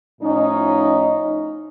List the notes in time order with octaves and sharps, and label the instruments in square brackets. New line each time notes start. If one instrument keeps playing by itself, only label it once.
[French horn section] A2 F3 C#4 D#4